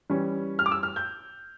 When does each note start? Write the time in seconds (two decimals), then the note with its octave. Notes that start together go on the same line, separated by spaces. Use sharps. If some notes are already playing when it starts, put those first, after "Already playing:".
0.10 E3 G3 C#4
0.59 F6
0.66 D6
0.72 E6
0.83 F6
0.96 G6